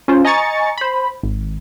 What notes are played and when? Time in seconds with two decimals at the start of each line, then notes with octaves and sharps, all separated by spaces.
0.08 C#4 F4 C5
0.25 D#5 G#5 A#5 C#6 A6 C#7
0.78 C5 B5
1.23 G#1